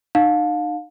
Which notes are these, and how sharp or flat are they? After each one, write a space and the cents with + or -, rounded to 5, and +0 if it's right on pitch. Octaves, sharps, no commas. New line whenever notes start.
D#4 -35 F5 +30 A5 +0